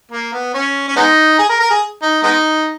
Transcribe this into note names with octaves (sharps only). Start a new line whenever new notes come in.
A#3
B3
C#4
C#4
G#3 B3 D#4
G#4
A#4
A#4
G#4
D#4
G#3 B3 D#4